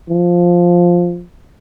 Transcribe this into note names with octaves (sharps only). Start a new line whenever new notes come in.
F3